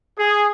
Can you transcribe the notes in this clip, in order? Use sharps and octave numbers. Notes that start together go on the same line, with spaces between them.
G#4